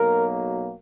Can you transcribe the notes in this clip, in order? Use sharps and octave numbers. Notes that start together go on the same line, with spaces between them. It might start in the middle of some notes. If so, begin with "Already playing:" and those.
Already playing: B1 B2 F#3 A#3 A#4